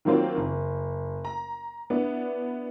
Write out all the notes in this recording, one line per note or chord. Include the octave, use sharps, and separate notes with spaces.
D#3 F#3 A#3 C4 F4
F#1
A#5
B3 D4 E4